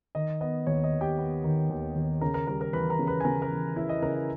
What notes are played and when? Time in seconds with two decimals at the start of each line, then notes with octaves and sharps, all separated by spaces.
0.15 D#3 D#5
0.41 B3 D#5
0.67 D#2 C#5
0.84 D#5
0.93 D#3
1.01 G4 G5
1.18 B3
1.44 D#3
1.70 D#2
1.96 D#2
2.21 C#3 A#4 A#5
2.34 A#4 A#5
2.47 G3 A#4 A#5
2.60 A#4 A#5
2.73 E3 B4 B5
2.90 A#4 A#5
2.99 C#3
3.07 B4 B5
3.20 G#5
3.25 C#3 A#4 A#5
3.42 A#4 A#5
3.51 E3
3.76 C#3 E4 E5
3.89 D#5
4.02 C#3 A#4 A#5
4.15 D#5